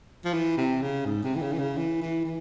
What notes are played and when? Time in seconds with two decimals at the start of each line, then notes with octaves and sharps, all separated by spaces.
0.25 F3
0.33 E3
0.57 C3
0.81 C#3
1.05 G#2
1.23 C3
1.35 E3
1.41 C#3
1.52 E3
1.59 C#3
1.77 E3
2.02 E3
2.25 E3